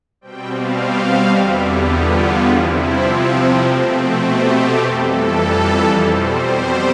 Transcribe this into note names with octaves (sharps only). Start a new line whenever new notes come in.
B2 G3 C4 G5
F5
E2 D3 G3 B3 E5
G4
F4
C3 F3 C4 E4
B2 A3 C4
G4
F2 E3 G3 A4
B2 G3 C4 C5